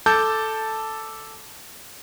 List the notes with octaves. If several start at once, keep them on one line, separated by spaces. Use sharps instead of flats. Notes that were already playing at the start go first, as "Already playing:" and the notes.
A4 A5 D6 G6